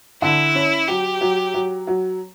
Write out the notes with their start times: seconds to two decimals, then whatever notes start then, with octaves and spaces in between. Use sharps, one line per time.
0.22 D3 E4
0.55 C#4
0.88 F#3 G4
1.21 F#3
1.54 F#3
1.87 F#3